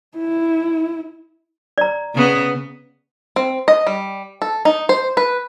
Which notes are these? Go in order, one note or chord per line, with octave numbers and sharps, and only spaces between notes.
E4
D5 A#5
C#3 B3
C4
D#5
G3
A4
D#4
C5
B4